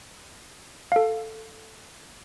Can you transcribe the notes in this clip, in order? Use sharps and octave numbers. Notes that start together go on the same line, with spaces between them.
A4 F5